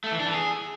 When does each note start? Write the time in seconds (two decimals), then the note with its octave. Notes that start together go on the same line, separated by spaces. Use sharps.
0.04 A3
0.11 E3
0.19 D4
0.26 E3
0.34 G#4